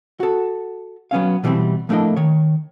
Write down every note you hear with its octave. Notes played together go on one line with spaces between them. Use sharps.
F#4 A4
F#3 B3 C#4 F5
B2 E3 G3 A3 C4
F3 A3 A#3 D4 E4 D#5
D#3 C#5